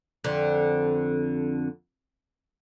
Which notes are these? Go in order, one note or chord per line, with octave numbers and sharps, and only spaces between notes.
F2 D3